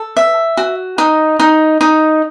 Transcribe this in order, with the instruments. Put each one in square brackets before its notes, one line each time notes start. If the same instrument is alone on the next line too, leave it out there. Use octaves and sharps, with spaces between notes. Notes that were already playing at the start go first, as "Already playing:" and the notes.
Already playing: [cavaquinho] A4
E5
F#4
D#4
D#4
D#4